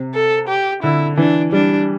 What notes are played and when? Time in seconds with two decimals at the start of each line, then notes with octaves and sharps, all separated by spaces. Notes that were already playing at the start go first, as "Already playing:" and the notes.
Already playing: C3
0.14 A4
0.49 G4
0.83 D3 E4
1.17 E3 D4
1.52 G3 D4